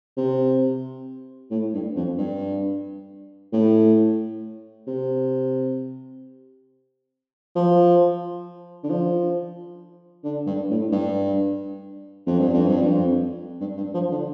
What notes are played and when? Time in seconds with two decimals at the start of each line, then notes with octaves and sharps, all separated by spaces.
0.17 C3
1.51 A2
1.74 G2
1.96 F2
2.18 G2
3.53 A2
4.87 C3
7.56 F3
8.84 D3
8.90 F3
10.24 D3
10.47 G2
10.70 A2
10.92 G2
12.27 F2
12.39 G2
12.53 F2
12.67 G2
12.81 F2
13.60 G2
13.77 G2
13.94 F3
14.11 D3